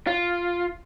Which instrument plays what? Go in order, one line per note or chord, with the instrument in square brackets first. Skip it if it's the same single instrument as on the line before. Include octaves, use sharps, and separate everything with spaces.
[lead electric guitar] F4